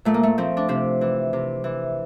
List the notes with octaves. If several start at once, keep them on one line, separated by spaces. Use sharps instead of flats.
A#2 A3
A#3
A3
F3 C4
D4
C3 C4
E3
C3
E3